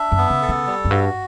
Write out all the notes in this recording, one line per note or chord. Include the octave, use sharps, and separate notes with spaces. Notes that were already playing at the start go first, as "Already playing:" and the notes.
Already playing: D4 E5
F#2
B3
C#3
A4
C#3
G3
F#2
G2 F#4